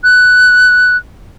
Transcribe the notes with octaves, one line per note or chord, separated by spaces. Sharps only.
F#6